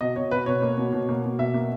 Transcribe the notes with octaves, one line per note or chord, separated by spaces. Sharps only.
B2 D#5
B2 C#5
B2 B4
B2 C#5
A#3
B2
B2
A#3
B2
B2 E5
A#3